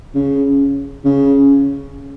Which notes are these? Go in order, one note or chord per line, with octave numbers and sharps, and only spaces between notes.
C#3
C#3